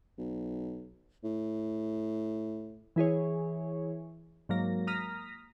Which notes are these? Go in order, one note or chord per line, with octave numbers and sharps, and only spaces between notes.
B1
A2
E3 E4 G#4 C#5
G#2 F#3 A#3 A#6
A#5 D#6 F6 A#6 B6